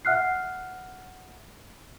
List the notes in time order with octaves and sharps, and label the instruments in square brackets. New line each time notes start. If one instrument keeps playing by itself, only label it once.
[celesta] E5 F#5 F6 F#6 C7